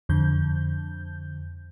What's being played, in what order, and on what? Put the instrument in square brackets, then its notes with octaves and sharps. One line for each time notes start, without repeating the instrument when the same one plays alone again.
[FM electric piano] F2 D3 G6